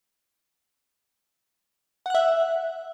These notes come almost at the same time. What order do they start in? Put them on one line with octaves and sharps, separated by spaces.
F#5 F#6 E5